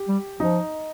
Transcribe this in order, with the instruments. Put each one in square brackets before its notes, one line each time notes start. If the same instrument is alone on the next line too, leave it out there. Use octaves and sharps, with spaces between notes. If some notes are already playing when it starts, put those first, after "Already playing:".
Already playing: [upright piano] G4
[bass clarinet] G3
[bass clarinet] F3 [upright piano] D#4 D#5